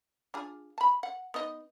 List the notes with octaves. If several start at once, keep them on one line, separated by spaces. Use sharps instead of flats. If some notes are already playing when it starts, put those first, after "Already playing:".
D4 F4 G#4
A5 B5
F#5
B3 D#4 D#5